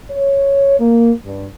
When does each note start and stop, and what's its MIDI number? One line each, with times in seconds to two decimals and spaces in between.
0.10 0.75 73
0.79 1.12 58
1.25 1.46 43